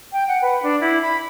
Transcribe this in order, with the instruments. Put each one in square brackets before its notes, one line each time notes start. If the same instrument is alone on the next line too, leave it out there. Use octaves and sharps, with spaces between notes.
[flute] G5
F#5
B4
D4
E4
B5